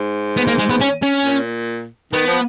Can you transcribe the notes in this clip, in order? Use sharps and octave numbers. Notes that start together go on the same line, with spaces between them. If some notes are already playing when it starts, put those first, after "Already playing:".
Already playing: G#2
B3
A#3
G#3
B3
C#4
C#4
A#2
D#3 B3
F3